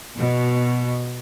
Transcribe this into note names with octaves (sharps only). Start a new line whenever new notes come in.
B2